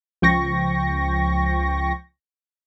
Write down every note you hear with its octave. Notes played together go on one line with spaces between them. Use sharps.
C#2 F3 G5 C#6 A#6